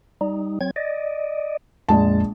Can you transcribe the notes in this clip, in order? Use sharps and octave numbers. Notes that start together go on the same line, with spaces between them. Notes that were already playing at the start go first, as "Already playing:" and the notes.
G3 D#4
F#3 C4 G#6
D5 D#5
A#1 F2 G#3 A5